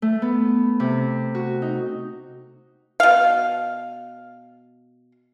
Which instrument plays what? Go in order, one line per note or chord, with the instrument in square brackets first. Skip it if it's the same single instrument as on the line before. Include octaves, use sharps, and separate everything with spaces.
[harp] A3
B3
C3
F#4
D#4
[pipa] B2 F5